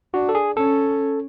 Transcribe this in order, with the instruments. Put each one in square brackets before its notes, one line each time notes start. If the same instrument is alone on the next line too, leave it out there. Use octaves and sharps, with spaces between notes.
[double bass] D4 [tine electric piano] F#4
[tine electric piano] A4
G#4
[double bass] C#4 [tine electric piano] A4